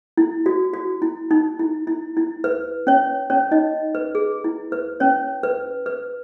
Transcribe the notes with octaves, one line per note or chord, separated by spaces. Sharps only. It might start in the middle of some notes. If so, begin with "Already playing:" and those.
E4
F#4
F#4
E4
D#4
E4
E4
E4
B4
C#4 C#5
C#4 C#5
D#4 D#5
B4
G#4
E4
B4
C#4 C#5
B4
B4